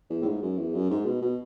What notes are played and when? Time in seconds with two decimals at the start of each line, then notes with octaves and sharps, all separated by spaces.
0.10 E2
0.22 A2
0.25 G#2
0.42 F#2
0.57 E2
0.74 F#2
0.90 G#2
1.05 B2
1.22 B2